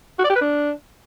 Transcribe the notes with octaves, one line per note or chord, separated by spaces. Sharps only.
F#4
D5
G4
B4
D4